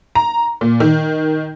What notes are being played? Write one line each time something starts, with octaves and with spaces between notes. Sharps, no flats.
A#5
A#2
D#3